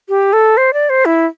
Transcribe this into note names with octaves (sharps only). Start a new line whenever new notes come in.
G4
A4
C5
D5
C5
E4